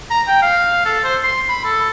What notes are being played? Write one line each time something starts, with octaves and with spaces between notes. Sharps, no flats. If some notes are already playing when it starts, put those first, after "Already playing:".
A#5
G5
F5
A4
C5
C6
B5
A4